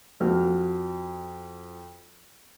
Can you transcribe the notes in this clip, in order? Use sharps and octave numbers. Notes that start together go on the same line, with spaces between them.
F2 F#4 F6